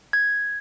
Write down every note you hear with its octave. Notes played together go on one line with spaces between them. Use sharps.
G#6